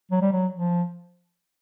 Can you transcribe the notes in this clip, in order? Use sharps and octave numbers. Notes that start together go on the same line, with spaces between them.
F#3
G3
F#3
F3